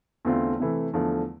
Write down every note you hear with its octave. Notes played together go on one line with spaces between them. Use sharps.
E2 D3 A3 C4 F4
C3 E3 A3
E2 D3 F3 A3